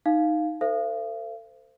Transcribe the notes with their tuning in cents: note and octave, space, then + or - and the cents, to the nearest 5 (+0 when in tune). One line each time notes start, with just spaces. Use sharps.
D#4 +0 F5 +0
A4 +35 C5 -20 F5 -45